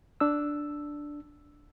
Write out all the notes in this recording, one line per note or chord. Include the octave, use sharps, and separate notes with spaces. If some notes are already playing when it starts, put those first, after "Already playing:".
D4 E6